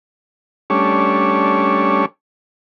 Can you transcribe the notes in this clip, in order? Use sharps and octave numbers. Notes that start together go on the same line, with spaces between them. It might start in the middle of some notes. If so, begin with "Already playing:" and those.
G3 A3 C#4 D4 C#5